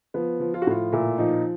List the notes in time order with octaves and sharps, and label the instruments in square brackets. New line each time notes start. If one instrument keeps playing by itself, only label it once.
[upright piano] F3 B3
F3
F4
F#4
A2 F4
A#2 E4
F3 D#4